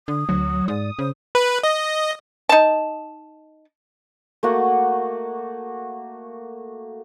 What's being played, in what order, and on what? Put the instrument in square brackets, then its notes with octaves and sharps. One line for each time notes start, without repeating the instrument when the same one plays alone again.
[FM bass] D3 [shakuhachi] D#6
[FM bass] D2 [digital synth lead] F#3
[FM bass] G#2 [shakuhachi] D5 [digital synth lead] D#6
[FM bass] C#3 [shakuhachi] C5
[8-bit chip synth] B4
D#5
[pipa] D#4 A5
[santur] A3 A#3 F#4 F#5